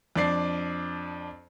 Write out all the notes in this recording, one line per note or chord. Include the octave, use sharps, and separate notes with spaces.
F2 D4 D5 C7